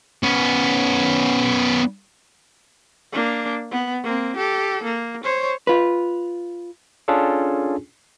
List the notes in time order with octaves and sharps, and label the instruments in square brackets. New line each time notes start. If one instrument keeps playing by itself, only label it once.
[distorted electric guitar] B3 C#4
[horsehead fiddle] A#3 D4
B3
A#3 C4
G4 A4
A#3
C5 C#5
[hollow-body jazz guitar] F4 B4
[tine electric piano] C#4 D4 F4 G#4 A4